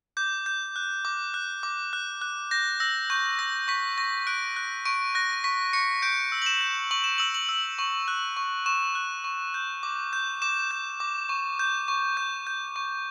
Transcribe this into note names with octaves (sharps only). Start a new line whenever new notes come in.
D6 G6
G6
F#6
D6
F#6
D6
F#6
F#6
G6 A#6
E6 A#6
C#6 G6
E6 A#6
C#6 B6
C#6 A#6
F#6 D7
F#6
C#6 D7
F#6 A#6
C#6 B6
C#6 C#7
G6 D7
E6
F#7
E7
G6
C#6 F#7
E7
E6 F#7
F#7
E6
C#6
F#6
C#6
C#6 E7
F#6
C#6
G6
D6
G6
D6 E7
G6
D6
C#6
G6
C#6
G6
G6
C#6